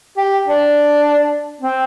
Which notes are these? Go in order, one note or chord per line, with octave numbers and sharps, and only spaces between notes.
G4
D4
C4